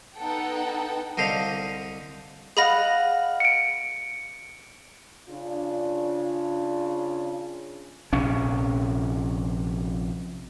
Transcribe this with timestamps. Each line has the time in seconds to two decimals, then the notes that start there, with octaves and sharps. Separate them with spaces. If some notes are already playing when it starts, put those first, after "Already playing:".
0.15 B3 D#4 A4 F#5 G5
1.17 C2 D3 C5 D#5 F5
2.57 G#4 D#5 F5 F#5 B5 A#6
3.40 C#7 D7
5.29 C#3 D4 F4
8.13 A#1 C3 C#4